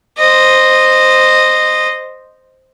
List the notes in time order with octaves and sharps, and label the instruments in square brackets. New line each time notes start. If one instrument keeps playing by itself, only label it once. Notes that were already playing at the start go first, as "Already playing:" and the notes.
[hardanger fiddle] C5 D#5